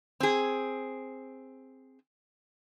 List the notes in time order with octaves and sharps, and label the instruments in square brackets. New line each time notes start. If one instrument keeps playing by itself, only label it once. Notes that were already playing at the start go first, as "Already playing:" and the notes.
[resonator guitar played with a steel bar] C4 G#4